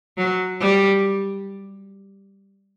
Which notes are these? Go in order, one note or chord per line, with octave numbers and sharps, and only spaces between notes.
F#3
G3